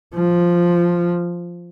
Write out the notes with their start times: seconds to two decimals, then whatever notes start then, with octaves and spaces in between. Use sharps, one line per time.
0.14 F3